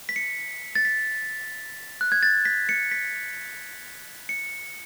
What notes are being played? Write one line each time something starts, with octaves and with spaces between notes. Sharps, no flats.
B6
C#7
A6
B6
F#6
G#6
A6
B6
C#7
B6
C#7